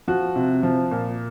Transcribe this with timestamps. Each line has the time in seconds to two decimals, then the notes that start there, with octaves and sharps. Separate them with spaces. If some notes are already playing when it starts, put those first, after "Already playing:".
0.08 F3 F#4
0.36 C3
0.63 F3
0.92 A#2